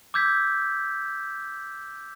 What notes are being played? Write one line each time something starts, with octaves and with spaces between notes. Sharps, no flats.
D6 E6 G6 G#6 B6